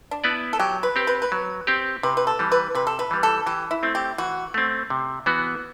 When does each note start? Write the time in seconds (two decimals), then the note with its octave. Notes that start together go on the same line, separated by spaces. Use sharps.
0.11 D4
0.24 B3 E4 B4 D5
0.53 A4
0.59 F#3 G4
0.83 B4
0.96 C4 G4
1.07 B4
1.22 B4
1.32 F#3
1.67 C4 G4
2.03 C3 B4
2.17 B4
2.27 A4
2.39 E3 G3
2.52 B4
2.75 C3 B4
2.87 A4
2.99 B4
3.11 E3 G3
3.23 A4
3.46 E3 G4
3.71 E4
3.83 A3 C4
3.95 G4
4.18 E3 F#4
4.54 A3 C4
4.90 C3
5.26 E3 B3 F#4